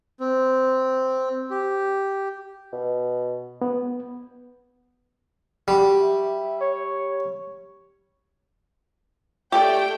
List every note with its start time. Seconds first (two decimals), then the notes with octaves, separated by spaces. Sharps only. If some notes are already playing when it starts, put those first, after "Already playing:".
0.20 C4
1.51 G4
2.73 B2
3.62 B3
5.68 G3 F#4
6.00 E5
6.61 C#5
9.52 A3 G4 A4 D5 G5